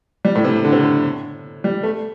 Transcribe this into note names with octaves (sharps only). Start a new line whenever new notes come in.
G3
A2
C3
D3
C3
D3
G3
A3